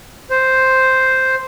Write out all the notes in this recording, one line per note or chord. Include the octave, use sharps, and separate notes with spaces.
C5